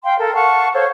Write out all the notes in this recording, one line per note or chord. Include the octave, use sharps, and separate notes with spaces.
F5 G5 C6
A4 A#4
F5 F#5 A5 C#6
A4 C5 C#5 F5